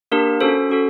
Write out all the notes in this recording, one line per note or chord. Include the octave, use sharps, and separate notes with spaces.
A#3 D4 G4 A#4
C#4 F#4 A4 C5
C#4 F#4 A4